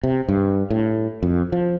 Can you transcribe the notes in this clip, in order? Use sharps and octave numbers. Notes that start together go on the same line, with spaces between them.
C3
G2
A2
F2
F3